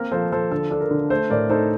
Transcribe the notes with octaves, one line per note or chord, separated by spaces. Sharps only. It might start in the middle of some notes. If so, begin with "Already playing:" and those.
Already playing: A#3 C4 A#4
F3 A4 C5
F3 A4 C5
D3 A4
D4 A4
A#4
D3
A3 A4 C5
A2 A#4 D5
D#4 A4 C5